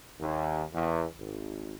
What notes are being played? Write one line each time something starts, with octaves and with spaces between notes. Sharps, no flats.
D#2
E2
G#1